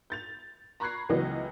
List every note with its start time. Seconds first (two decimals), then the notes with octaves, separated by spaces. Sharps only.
0.10 G6 A6 F7
0.80 A#5 B5 C#6 F#6 G#6 C7
1.09 C#2 E3 F#3 B3 D#5